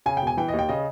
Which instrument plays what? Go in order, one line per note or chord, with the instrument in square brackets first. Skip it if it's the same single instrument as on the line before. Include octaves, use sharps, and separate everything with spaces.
[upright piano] C#3 G#5
G5
E1 G#5
E3 G5
D#5
D#2
G5
C#3 D#5